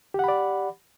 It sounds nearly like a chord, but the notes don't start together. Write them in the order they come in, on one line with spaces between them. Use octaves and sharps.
G4 F#5 B5 D5